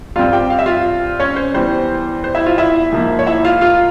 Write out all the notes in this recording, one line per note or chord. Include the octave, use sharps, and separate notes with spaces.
G2 G3 C4 F4 F5
G4 G5
F5
E5
F4 F5
C#4 C#5
C5
E2 E3 G3 C5
C5
E4 E5
F4 F5
E4 E5
G#2 F3 A#3
C#5
E4 E5
F4 F5
F4 F5